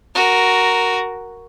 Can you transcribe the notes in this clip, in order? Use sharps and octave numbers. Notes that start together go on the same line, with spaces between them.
F#4 A#4